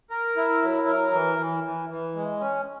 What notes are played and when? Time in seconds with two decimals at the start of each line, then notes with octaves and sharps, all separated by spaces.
0.10 A#4
0.37 E4
0.62 F#3
0.88 A#4
1.12 E3
1.38 E3
1.64 E3
1.90 E3
2.15 G#3
2.41 C#4